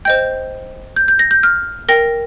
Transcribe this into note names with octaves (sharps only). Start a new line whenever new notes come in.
C5 D#5 G5 G6
G6
G6
A#6
G6
F6
A#4 G5 A#6